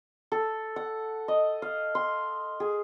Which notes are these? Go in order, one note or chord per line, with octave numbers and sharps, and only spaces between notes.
A4
F#5
D#5
F5
C6
G#4